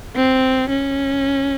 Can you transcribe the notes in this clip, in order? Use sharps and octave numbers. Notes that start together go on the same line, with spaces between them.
C4
C#4